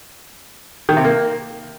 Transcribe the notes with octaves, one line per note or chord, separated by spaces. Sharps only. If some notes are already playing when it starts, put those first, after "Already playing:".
D#3
C3
A#3